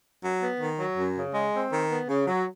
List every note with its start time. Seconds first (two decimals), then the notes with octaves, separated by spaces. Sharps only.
0.23 F#3
0.43 B3
0.61 D#3
0.80 F#3
0.98 F#2
1.16 C#3
1.35 G#3
1.53 C4
1.72 D#3
1.90 B3
2.09 C#3
2.27 F#3